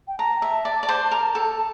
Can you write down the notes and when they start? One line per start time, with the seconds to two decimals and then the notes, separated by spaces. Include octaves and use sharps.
0.08 G5
0.18 A5 A#5
0.42 E5
0.65 D5
0.83 D5
0.89 C5
1.11 A#4
1.35 A4